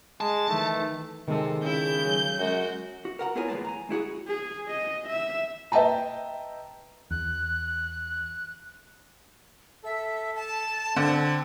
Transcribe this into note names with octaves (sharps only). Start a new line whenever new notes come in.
G#3 A5
D#3 E3 A3
C3 D#3 G#3 A4
C#3 E4 G6
F#3
F#2 G#3 F#4
F#4
A#4 F#5 A#5
B3 E4 F4 A#4 C#5 G#5
E2 A#2 E3 G#3 B3 A5
G#5 A#5
G#3 E4 F#4 G#4
G#4
D#5
E5
B4 D#5 E5 G5 A5 A#5
E2 F#6
A4 E5
A5
D3 C4